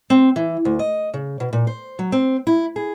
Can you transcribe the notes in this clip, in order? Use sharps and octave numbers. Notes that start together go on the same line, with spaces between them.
C4
E3
D2
D#5
C#3
B2
A#2
C5
F#3
C4
E4
G#4